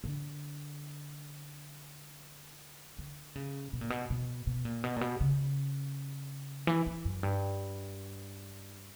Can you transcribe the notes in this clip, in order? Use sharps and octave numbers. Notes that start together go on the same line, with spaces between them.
D3
D3
C#3
B2
A#2
B2
B2
B2
A#2
B2
A#2
B2
C#3
E3
E3
F#2
G2